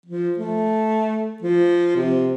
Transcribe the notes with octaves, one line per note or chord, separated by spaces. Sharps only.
F3
A3
F3
C3